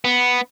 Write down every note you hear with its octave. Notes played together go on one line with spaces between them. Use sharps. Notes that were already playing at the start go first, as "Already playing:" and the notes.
B3